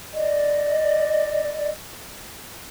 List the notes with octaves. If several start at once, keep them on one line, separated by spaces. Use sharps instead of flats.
D5 D#5